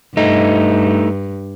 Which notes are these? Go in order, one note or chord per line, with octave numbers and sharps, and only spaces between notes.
G2 A3 D#4